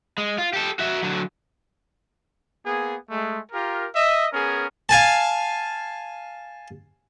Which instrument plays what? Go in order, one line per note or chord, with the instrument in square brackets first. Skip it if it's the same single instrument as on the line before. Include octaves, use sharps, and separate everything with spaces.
[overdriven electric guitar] G#3
F4
G4 A4
F#4 E5
D3 F#3
[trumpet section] A#3 B3 G#4
G#3 A3
F4 G4 A#4
D#5 E5
B3 C#4 G#4 A#4
[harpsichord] F5 G#5 A5